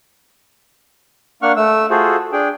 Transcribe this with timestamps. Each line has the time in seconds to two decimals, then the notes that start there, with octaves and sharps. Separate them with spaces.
1.42 A#3 D4 F#5 C#6 F6
1.56 A3 E6
1.90 F4 F#4 G#4 A4 C5
2.32 D4 G#4 G5